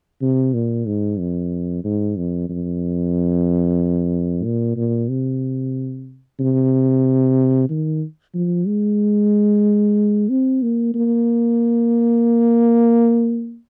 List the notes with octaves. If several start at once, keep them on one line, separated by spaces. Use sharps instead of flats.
C3
A#2
G#2
F2
G#2
F2
F2
A#2
A#2
C3
C3
D#3
F3
G#3
C4
A#3
A#3